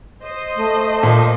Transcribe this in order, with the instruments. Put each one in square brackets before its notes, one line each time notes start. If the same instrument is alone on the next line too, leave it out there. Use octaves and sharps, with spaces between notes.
[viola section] C5 D#5
[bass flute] A3
[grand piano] A#2